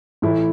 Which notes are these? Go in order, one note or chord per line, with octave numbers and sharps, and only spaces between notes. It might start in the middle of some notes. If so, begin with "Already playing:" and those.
A2 E3 A3 E4